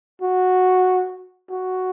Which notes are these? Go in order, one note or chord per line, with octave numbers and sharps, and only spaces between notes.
F#4
F#4